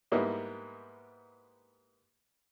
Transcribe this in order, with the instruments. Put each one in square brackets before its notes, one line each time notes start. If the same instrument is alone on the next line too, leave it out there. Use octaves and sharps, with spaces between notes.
[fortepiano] G#2 G3 A#3 B3 D#4 E4